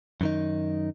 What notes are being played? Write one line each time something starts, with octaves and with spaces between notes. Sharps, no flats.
F#2 D#3 D#4